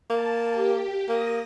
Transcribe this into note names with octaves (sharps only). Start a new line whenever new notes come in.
A#3 A5
G4
A#3 D#6 A#6